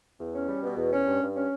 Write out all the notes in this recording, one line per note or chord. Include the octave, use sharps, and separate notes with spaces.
E2
C#4
G3
B2
E2
C#4
G2
G2
C#4